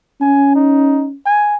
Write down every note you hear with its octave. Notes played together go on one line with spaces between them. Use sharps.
C#4 G#5
D#4
G#5